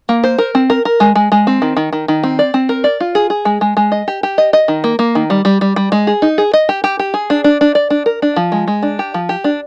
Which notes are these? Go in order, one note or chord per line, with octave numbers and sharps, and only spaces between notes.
A#3
C5
A#4
C4
A#4
A#4
G#3
G#3
G#3
C4
D#3
D#3
D#3
D#3
C4
D5
C4
A#4
D5
F4
G#4
G#4
G#3
G#3
G#3
D#5
G4
G4
D#5
D#5
D#3
A#3
A#3
D#3
G3
G3
G3
G3
G#3
G#4
D#4
G#4
D#5
G4
G4
G4
G#4
D4
D4
D4
D5
D4
A#4
D4
F3
G#3
G#3
D4
G4
F3
G4
D4